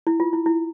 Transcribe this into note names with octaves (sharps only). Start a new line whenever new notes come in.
E4
F4
E4
E4